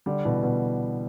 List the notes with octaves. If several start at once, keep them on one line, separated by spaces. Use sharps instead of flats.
D3 G3
B2 E3
B2